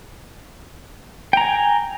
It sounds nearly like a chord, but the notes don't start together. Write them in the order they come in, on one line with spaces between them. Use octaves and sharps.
G5 A#5 G#5